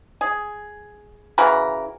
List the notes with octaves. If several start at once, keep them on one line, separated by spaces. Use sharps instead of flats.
G#4
C#3 E3 F#4 A#4